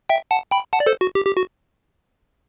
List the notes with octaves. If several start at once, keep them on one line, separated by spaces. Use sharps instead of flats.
E5 G5
F#5 A5
G5 B5
F#5 A5
D5
A4 C5
F#4
G4
G4
F#4